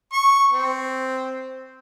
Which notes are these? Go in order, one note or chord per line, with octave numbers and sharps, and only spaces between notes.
C#6
C4